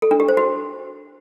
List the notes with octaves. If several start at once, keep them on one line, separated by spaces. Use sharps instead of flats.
A4
D4
G4
C5
F#4